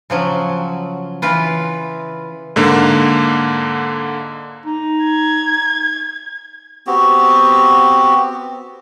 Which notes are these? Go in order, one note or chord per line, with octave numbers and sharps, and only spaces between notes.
C#3 F3 F#3
E3 F4 B4
G#2 D3 A#3
D#4
G#6
B3 C4 F#4 G4